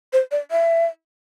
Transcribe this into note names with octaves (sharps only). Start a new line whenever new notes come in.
C5
D5
E5